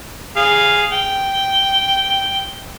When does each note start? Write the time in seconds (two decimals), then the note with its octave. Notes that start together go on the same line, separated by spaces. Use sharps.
0.37 G#4 F5
0.92 G5